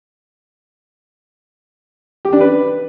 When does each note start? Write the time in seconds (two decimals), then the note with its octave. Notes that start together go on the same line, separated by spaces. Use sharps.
2.25 G4
2.33 D4
2.41 B4